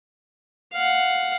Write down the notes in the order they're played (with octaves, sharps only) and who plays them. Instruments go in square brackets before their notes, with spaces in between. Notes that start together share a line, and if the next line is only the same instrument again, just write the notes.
[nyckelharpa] F5 F#5